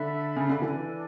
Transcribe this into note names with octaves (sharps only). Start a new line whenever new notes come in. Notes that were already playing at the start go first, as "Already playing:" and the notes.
Already playing: D3 A4 E5 B5
C#3
D3
E3 D4 A4 D5 G#5